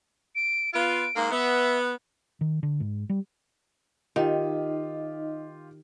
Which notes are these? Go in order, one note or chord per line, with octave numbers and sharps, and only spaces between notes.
D7
B3 F4 D7
G#2 A#3
B3 E5
D#3
D3
G#2
G3
D#3 D#4 F4 G4 D#5